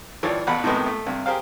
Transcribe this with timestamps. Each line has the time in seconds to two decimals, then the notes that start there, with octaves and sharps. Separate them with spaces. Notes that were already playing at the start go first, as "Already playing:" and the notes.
0.23 G#1 E3 F3 C#5 D5
0.47 A1 B2 F#5 B5
0.64 A2 C3 D#3 G#3 B3 D#4
0.86 A3
1.07 G2 C3
1.26 G4 G#4 A#4 C5 F5